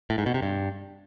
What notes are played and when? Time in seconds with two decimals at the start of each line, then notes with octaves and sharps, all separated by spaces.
0.10 A2
0.18 G#2
0.26 B2
0.34 C3
0.42 G2